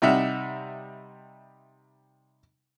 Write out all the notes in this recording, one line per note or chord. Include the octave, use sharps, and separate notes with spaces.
C3 G3 D#4 E5 F#5